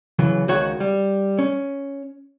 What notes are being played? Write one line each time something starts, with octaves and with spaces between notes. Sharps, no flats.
C#3 E3 F#3
C#2 D#3 F#4 C#5 F#5
G3
C#4